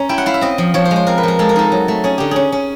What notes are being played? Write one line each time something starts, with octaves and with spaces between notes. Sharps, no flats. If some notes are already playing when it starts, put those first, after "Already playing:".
Already playing: C#4 A#5
E4 G5
F#5
E4 F5
E5
C4 D#5
F3
F3 C#5
C5
G#3
C5
C4 A#4
B4
F3 A#4
G#3 A4
A#4
D#4 A4
F#3
A3
C#4 G#4
D3 G4
C#4 G#4
C#4